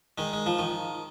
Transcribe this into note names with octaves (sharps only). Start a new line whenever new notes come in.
D#3 G#3
G#3
F3
D#3